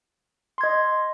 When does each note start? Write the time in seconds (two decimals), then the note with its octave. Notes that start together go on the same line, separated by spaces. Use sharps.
0.58 C6
0.61 G#6
0.63 D#5